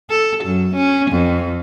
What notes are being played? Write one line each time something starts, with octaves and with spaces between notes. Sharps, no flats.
A4
F#2
C#4
F2